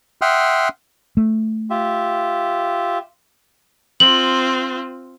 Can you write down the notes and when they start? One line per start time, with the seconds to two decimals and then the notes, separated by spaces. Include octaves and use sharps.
0.22 E5 F#5 G5 C6 D#6 F6
1.17 A3
1.70 F4 G4 E5
4.00 C4 F4 F#7